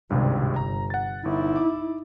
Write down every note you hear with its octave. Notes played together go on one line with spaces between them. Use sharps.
G#1 C#2 G2 C3
G1 A#5
F#5 A6
G1 D#4 E4
D6